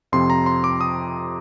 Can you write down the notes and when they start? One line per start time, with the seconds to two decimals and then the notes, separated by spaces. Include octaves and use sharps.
0.12 F2 C3 F3 C6
0.30 A#5
0.46 C6
0.64 D6
0.81 D#6